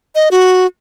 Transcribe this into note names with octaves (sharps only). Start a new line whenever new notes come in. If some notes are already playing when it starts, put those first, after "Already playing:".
D#5
F#4